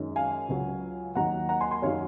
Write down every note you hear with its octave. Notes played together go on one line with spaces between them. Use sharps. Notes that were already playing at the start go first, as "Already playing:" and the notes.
Already playing: F#2 D#3 G#3 C#4
F5 G#5
C#2 C#3 F#3
D#2 D#3 F#3 A#3 F#5 A#5
F#5 A#5
G#5 C6
G#5 C6
F#2 D#3 F#3 C#5 F5